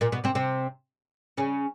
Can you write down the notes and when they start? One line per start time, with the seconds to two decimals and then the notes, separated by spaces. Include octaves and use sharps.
0.01 A#2 A#3
0.12 B2 B3
0.24 C3 C4
0.35 C3 C4
1.37 C#3 C#4